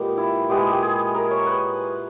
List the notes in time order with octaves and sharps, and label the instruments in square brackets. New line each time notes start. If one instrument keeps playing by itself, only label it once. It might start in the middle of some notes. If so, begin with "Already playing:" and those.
Already playing: [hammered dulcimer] A#2 G#3 B3 G4
E4
A#2 G#3 B3 G4
G#4
G4
G#4
A#4
C#5
B4